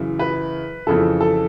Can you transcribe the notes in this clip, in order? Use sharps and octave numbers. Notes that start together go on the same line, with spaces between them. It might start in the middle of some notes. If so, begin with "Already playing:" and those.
Already playing: F#2 C#3 E3
B4
F2 C#3 E3 A4
A4